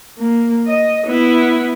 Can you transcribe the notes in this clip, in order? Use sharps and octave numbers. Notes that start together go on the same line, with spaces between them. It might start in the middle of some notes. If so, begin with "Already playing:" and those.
A#3
D#5
B3 E4